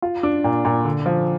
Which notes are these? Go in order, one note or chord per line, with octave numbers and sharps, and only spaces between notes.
F4
D4
A#2
A#2
D3
F3